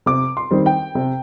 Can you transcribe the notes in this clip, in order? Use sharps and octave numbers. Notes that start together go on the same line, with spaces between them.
C3 D6
C6
D#3 G3 C4
G5
C3